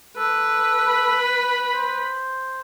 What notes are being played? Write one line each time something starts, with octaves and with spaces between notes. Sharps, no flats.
A4 B4
B5
C5